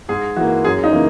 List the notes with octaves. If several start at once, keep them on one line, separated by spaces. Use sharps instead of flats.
G#2 G#4
E3 A#3 F#4
F#2 G#4
D#4
C#3 E3 A#3